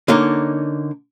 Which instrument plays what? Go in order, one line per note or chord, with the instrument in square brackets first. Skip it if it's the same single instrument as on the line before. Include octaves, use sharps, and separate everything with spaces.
[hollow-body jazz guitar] D3 A#3 C#4 D#4